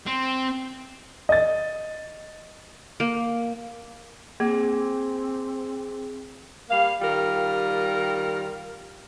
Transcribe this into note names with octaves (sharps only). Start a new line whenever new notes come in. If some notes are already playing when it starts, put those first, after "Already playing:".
C4
D#5 A6
A#3
A#3 C4 G#4
G3 A#3 F5
D#3 G3 F4 A#4